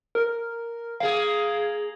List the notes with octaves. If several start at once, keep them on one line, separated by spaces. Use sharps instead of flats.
A#4
A#3 G#4 F5